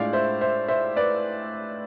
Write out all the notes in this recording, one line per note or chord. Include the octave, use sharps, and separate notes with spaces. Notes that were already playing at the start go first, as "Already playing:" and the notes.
Already playing: A2 G#3 D4 F4 D5 F5
C5 E5
C5 E5
C5 E5
B4 D5